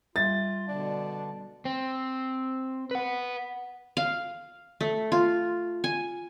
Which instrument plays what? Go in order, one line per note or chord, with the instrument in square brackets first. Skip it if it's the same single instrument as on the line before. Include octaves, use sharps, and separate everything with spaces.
[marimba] G3 E5 [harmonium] F4 [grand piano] A6
[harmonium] B2 D3 A5 [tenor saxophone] D4
[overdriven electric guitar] C4
B4 F#5
[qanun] F5
A3
F4
G#5